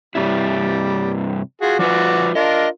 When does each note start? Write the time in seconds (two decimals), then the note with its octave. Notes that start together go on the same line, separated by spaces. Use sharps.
0.15 G2 C3 G3 E4
1.61 F4 F#4 G#4
1.79 F3 F4 F#4 B4 D5
2.35 D4 F4 A#4 D#5